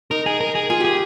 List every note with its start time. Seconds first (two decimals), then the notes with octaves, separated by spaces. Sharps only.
0.11 D#4 A#4
0.26 G#4
0.40 A#4
0.55 G#4
0.70 F4 G#4
0.80 G4 G#4